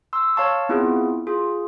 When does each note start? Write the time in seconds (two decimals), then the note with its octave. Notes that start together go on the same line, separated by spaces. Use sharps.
0.13 C6 E6
0.36 C#5 F5 A5 C#6
0.69 B3 C4 E4 F4 G#4
1.27 F4 G#4